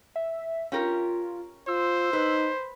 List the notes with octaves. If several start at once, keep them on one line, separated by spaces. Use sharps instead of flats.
E5
C#4 F4 G4 A#4
F4 C5 E6
D#4 B4